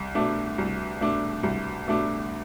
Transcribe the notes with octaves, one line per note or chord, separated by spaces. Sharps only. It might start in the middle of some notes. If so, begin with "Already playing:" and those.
Already playing: C2
B2 A3 D4
C2
B2 A3 D4
C2
B2 A3 D4